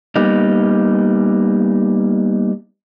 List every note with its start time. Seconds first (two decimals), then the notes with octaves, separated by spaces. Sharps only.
0.16 G3 A#3 B3 D#4